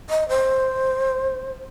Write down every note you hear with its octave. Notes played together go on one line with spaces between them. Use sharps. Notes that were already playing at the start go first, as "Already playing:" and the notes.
D#5
C5